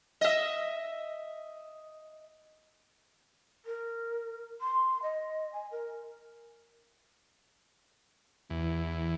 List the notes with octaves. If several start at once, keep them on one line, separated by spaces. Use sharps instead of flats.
D#5 E5
A#4
C6
D#5
G#5
A#4
E2 E3